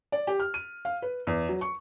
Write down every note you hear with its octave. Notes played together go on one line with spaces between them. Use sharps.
D5
G4
F6
D#7
F5
B4
E2
F#3
C#6